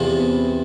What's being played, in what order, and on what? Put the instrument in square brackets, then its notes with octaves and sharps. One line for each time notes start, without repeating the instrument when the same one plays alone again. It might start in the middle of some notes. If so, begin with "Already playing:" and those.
Already playing: [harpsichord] E2 C3 F3 [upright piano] C4
[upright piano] B3